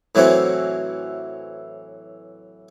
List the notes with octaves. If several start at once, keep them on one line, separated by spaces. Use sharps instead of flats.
A2 E3 F#3 C4 F#4